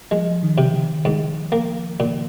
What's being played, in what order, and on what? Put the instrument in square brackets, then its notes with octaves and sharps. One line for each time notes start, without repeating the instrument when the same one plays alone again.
[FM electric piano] F3 [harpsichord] G#3
[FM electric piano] D#3
[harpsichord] C3
[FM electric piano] D#3
[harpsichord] G#2
A#3
A#2